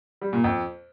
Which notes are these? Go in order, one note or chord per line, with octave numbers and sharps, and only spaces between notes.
G3
A#2
F2